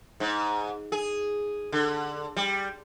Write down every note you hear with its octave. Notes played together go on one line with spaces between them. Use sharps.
G#2
G#4
D3
G3